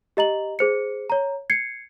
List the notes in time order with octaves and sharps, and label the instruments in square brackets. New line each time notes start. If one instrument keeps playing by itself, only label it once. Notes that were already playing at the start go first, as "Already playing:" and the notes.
[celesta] G4 D#5 A#5 F#7
G#4 C5 C#7
C#5 A#5
G#6 C7 C#7